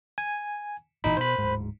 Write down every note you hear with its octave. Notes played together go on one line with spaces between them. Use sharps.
G#5
G#1 A#2 E3 D#4 B5
B2 C5 B5
D1 G#2